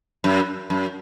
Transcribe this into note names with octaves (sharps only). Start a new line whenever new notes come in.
F#2
F#2